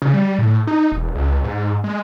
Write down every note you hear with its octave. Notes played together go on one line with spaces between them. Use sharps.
C#3
G3
A2
D#4
E1
C#2
G#2
G#3